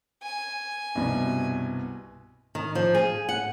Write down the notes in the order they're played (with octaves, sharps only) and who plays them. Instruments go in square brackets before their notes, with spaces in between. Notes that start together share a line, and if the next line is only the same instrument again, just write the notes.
[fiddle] G#5
[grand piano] C2 G2 B2
[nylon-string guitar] D#3
F3
G#4
F#5